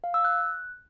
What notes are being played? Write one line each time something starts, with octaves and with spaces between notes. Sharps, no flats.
F5
E6
F#6